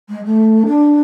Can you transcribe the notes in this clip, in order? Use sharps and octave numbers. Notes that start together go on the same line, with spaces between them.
G#3
A3
D4